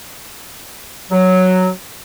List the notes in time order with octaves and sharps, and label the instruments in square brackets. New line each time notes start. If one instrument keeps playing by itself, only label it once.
[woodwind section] F#3